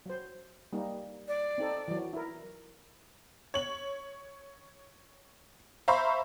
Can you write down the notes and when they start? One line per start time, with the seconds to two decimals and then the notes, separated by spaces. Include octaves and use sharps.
0.06 F#3 C5
0.73 G3 A#3 D#4
1.28 D5
1.58 C4 D#4 A4
1.88 E3 F#3
2.13 E4 A#4
3.54 C#5 F#7
5.88 C5 E5 F5 A#5 B5 C#6